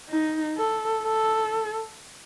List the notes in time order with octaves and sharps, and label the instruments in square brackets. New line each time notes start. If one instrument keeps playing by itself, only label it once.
[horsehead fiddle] D#4
A4
A4